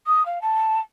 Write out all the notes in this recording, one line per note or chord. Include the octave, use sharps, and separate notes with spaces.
D#6
F5
A5